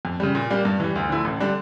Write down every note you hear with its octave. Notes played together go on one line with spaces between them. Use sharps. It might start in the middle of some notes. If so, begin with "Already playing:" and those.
F2
C#3 G3
A#2
G3 A#3 D4
G2
E3 G3
D2
D3 F3 A3 E4
A1
D3 G3 D4